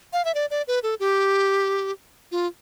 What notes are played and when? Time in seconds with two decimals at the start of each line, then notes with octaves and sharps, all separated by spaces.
0.13 F5
0.25 E5
0.35 D5
0.51 D5
0.68 B4
0.83 A4
1.00 G4
2.32 F4